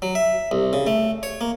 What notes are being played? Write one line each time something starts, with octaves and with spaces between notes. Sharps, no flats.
F#3
E5
C2
C#3
A3
C#5
A#3